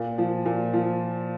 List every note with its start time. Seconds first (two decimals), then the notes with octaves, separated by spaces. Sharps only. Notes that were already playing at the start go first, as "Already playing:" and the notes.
Already playing: A#2
0.18 F3
0.46 A#2
0.73 F3